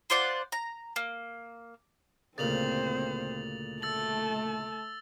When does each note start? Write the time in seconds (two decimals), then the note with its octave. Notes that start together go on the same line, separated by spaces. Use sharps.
0.10 F4 C5 D5 F#5
0.52 A#5
0.96 A#3
2.38 D2 A#2 C#3 C4 C5 A6 F7 F#7
3.82 A3 A5 E6 A6 F#7